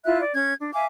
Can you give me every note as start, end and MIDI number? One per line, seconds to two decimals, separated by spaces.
0.05 0.20 64
0.05 0.20 65
0.05 0.20 76
0.05 0.20 90
0.22 0.32 74
0.35 0.53 61
0.35 0.53 92
0.60 0.70 62
0.74 0.86 76
0.74 0.86 77
0.74 0.86 80
0.74 0.86 86